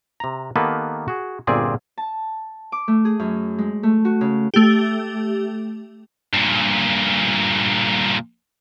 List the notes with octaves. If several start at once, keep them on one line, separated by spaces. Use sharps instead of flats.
C3 A#5
D#3 A#3 B3 G4 A4 B4
F#4 G#4
G1 A#2 C4 G#4 D5 E5
A5
D6
A3
G#4
F#2
G#3
A3
F#4
C#3
A3 G4
G2 A#2